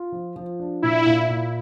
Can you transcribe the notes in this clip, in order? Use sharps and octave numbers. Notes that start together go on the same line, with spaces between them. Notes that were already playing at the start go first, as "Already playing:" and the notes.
Already playing: F4
F3
F3
D4
A#2 E4
A#2
A#2